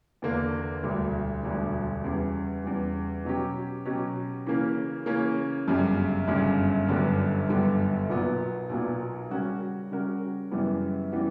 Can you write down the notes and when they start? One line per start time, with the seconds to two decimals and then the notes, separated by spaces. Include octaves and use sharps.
0.22 E2 D3 A#3
0.83 E1 D2 D3 G3
1.43 E1 D2 D3 G3
2.04 E2 C#3 G3
2.64 E2 C#3 G3
3.25 B2 F#3 C#4 G4
3.85 B2 F#3 C#4 G4
4.46 C#3 E3 A#3 C#4
5.06 C#3 E3 A#3 C#4
5.68 G1 F#2 C#3 G3
6.27 G1 F#2 C#3 G3
6.88 G1 F#2 D3 G3 B3
7.49 G1 F#2 D3 G3 B3
8.09 B1 A#2 F#3 B3
8.69 B1 A#2 F#3 B3
9.30 C#3 G3 C#4 F#4 A#4
9.91 C#3 G3 C#4 F#4 A#4
10.51 F#2 C#3 E3 G3 B3
11.12 C#3 E3 G3 B3